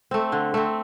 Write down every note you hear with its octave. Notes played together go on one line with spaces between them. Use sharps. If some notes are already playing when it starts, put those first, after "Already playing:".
A3 C4
D3
A3 C4